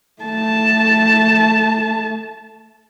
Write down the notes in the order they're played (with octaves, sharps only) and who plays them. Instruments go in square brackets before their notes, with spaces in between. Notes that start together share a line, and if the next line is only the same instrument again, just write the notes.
[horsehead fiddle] A3 A5